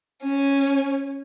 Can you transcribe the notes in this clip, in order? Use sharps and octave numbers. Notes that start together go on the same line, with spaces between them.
C#4